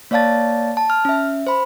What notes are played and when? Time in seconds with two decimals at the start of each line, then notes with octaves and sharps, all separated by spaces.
0.11 A#3 C#5 D5 F5 A5 A6
0.77 A5
0.90 F6
1.05 C#4 E5
1.47 C5 B5